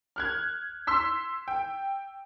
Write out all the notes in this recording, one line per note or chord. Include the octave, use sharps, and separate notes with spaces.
F6 F#6 G#6
C6 E6 B6
G5